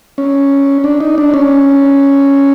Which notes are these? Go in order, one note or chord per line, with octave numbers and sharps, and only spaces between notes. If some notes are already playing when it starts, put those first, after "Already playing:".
C#4
D4
D#4
D4
C#4